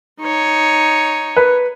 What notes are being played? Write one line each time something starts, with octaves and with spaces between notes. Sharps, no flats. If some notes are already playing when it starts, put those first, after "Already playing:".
D#4 C#5
B4